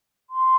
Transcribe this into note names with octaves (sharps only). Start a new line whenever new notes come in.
C6